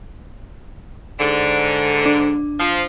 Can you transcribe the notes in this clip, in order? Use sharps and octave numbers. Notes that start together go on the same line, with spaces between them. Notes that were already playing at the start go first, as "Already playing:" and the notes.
G#2 D3
D4
F3